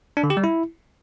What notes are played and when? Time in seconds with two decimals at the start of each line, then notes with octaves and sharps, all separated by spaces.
0.17 D4
0.24 D3
0.30 G4
0.37 G3
0.44 E4